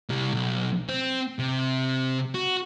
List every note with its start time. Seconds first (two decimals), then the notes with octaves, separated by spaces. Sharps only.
0.09 C2 G3
0.33 B1
0.89 C4
1.39 C3
2.34 F#4